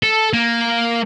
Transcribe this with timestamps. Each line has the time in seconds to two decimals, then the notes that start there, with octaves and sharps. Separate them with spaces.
0.03 A4
0.34 A#3